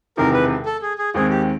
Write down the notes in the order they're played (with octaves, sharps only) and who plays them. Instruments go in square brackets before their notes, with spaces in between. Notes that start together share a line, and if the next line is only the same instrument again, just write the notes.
[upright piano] E1 E2 C3 D#3 [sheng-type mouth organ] A#4
[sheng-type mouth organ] B4
A4
G#4
G#4
[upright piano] D#2 D#3 G#3 C4 [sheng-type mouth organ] G#4
[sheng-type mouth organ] G4